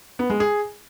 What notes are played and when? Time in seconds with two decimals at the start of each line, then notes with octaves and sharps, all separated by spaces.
0.19 B3
0.30 G#3
0.40 G#4